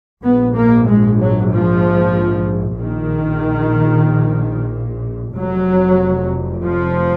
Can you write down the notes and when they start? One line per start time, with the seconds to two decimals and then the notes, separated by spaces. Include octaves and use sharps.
0.23 A#1 G#2 B3
0.55 A#3
0.87 G#3
1.19 F#3
1.52 F3
2.79 A#1 A#2 D#3
5.36 F1 F2 F#3
6.63 F3